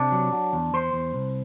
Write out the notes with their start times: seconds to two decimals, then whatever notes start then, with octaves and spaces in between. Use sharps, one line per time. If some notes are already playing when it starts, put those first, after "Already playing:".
Already playing: C3 D4
0.12 F#3
0.32 F#3
0.53 E2
0.73 E2 C5
0.93 E2
1.14 C2